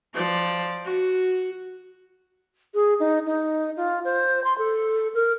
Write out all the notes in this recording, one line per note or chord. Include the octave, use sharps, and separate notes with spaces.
F3 D5
F#4
G#4
D#4
D#4
F4
C5
C6
A4
A#4